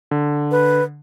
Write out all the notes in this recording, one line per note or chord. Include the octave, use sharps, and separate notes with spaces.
D3
B4